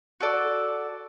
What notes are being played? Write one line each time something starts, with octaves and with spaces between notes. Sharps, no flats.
F#4 A4 D5